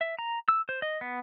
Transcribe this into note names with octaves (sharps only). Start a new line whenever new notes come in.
E5
A#5
E6
C5
D#5
B3